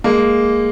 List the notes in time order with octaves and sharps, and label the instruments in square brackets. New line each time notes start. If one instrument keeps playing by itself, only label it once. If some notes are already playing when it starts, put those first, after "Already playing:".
[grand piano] G#3 A#3